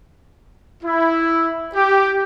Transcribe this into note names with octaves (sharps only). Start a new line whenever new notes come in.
E4
G4